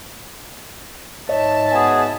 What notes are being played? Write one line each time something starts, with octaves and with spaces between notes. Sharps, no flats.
G#2 C#5 D#5 E5 A5
B3 F#4 G#4